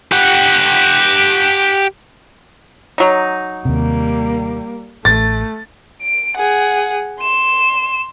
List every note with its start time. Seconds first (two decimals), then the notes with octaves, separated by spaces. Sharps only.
0.12 G4 F#5
2.98 F#3 D#4
3.65 D#2 C3 G3 A#3
5.05 A1 A3 A6
6.02 D7
6.37 G#4 F#5
7.20 C6 E7